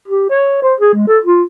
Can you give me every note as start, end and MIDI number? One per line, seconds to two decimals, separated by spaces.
0.08 0.28 67
0.30 0.59 73
0.63 0.74 72
0.80 0.92 68
0.94 1.07 56
1.07 1.19 69
1.25 1.43 65